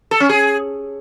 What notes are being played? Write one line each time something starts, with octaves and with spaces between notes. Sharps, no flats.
A4
C#4
G#4